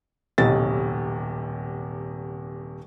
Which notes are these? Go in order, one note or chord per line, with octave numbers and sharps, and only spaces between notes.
D#1 B1 C3 A6